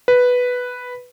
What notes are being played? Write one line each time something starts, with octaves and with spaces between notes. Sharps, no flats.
B4